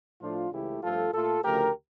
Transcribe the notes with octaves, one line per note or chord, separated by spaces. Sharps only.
A2 F3 A3 D4 F4
C#2 C#3 E3 A3 E4 G4
G2 F3 A3 F4 A4
A#2 A3 F4 A4
D2 C#3 F3 A3 G4 A#4